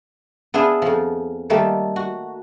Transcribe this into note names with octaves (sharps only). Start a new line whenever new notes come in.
B3 D4 E4 F4 G#4
F2 F3
D#3 G3 A3 A#3
F#4